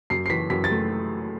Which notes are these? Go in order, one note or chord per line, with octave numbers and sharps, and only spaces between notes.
F#2 C7
C7
E3 B6
F#2 B6
A6
A3